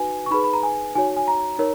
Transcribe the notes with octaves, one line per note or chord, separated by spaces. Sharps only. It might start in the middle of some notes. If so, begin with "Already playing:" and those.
Already playing: D#4 F#4 B4 G#5
C#6
D#4 G#4 B4 B5
B5
A#5
G#5
D#4 F#4 C#5 G#5
G#5
A#5
D#4 A#4 C#5